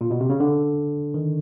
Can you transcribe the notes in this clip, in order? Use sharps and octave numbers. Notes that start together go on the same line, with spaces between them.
A#2
B2
C3
C#3
D3
D#3